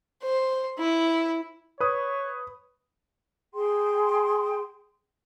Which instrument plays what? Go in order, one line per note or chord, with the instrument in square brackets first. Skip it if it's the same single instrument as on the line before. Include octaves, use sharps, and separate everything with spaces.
[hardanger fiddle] C5
E4
[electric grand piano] B4 D#6 [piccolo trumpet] C#5
[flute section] G#4 G5 C6